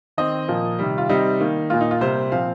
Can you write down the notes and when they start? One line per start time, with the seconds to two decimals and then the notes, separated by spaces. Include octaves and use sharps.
0.17 D#3 C4 D#5
0.48 A#2 F3 A#3
0.79 C3 D#3 G3
0.98 F4
1.09 C3 G3 C4 D#4
1.40 D#3 A#3
1.70 A#2 A#3 F4
1.81 D#4
1.91 F4
2.01 C3 G3 A#3 C5
2.32 A#2 F3 C4 F5